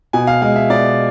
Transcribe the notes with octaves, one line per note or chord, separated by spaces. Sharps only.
B2 G#5
F5
G#3 F5
E5
B2 D5